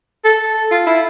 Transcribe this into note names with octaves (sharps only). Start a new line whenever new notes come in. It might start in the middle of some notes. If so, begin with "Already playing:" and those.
A4
F4
E4